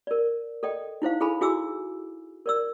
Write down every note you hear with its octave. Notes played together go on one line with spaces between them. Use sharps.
A#4 D5
A4 D5 D#5 G5
D#4 E4 C5 F5
E4 G#4 A4 G#5 B5
E4 F#4 G#4 G#5 D6 E6
A#4 D5 E6